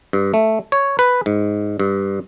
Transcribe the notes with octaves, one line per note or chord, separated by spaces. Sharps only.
G2
A3
C#5
B4
G#2
G2